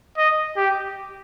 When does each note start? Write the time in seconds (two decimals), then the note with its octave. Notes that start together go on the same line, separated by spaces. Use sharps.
0.17 D#5
0.57 G4